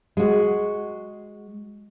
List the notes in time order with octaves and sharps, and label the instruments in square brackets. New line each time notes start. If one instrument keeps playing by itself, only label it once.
[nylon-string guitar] G#3 F#4